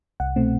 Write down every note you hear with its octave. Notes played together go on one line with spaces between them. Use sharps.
C2 F#5
B2 A3 C4